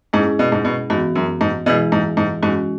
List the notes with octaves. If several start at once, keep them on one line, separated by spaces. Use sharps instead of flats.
G#2 G#3 C#4 E4 G#4
B2
G#2
B2
G#2 E3 B3 F#4
F#2
G#2
B2 E3 G#3 E4 G#4
G#2
G#2
G#2 G#3 C#4 F#4